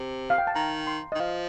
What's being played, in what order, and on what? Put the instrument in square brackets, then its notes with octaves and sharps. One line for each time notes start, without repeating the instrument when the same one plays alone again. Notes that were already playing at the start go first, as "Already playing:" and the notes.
Already playing: [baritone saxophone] C3
[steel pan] F5
G5
A5
[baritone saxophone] D#3 [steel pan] A#5
[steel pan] C6
D#5
[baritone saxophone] D#3
[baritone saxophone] F3 [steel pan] F5